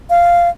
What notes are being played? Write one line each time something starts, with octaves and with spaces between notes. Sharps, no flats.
F5